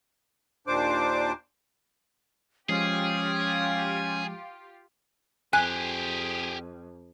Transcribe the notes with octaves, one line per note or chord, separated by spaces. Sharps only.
D#2 A#2 D4 C5 D6
F3 G#3 C#4 F4 G4 G#4 C7
F2 G4 G#4 G#5 F#6